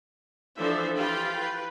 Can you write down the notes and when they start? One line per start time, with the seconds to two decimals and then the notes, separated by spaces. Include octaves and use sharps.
0.57 E3 F3 D4 A4 C5 E5
0.97 E3 F4 G4 F5 G5 B5
1.40 B4